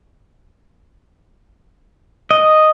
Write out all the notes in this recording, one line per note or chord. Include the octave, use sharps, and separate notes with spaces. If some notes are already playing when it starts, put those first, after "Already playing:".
D#5